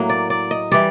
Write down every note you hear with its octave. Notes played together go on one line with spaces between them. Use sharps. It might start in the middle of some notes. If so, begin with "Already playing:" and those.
Already playing: A2 F#3 A#3
D5
D5
D#5
E3 G3 D5